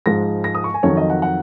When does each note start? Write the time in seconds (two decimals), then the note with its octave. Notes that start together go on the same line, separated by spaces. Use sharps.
0.06 G#2 F3 G#3 A#6
0.44 A#6
0.55 D#6
0.64 C#6
0.74 G#5
0.83 F2 D#3 F#3 C#5
0.97 D#5
1.10 F#5
1.22 F#5